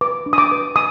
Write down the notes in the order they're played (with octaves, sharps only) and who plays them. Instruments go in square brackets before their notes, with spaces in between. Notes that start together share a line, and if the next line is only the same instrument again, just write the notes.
[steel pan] B4 D6
D4
D#6
D6
B4
D#6